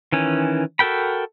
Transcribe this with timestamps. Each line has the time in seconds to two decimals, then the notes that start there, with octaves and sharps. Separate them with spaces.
0.12 D#3 E3 C#4
0.79 F#4 A4 A#4 G5 B5